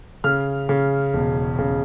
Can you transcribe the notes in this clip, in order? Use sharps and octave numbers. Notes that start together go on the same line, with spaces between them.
C#3 F6
C#3
E1
C#3